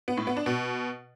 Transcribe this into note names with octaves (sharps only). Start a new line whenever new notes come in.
B3
A2
B3
D4
B2